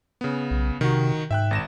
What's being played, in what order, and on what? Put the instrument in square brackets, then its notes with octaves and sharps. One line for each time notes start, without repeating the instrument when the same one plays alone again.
[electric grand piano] C#3 B3
[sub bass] B1
[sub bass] C3 [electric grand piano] D#3 F#4
[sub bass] G#2 [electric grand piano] E5 G5 F#6
[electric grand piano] G#1 A#6 E7